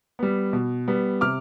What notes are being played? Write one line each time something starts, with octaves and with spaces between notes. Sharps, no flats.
G3 B3
B2
G3 B3
C3 D6 F6